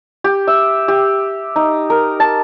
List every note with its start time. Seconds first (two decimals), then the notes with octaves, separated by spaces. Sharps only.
0.24 G4
0.47 E5
0.88 G4
1.56 D#4
1.90 A#4
2.20 A5